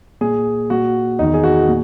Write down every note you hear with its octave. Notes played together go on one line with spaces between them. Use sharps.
A#2 G#4
A#2 F#4
E2 D#3 D#4
G#4
F#4
A#2